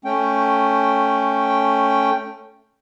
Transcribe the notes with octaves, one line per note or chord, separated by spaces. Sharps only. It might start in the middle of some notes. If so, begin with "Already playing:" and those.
A3 C#4 G5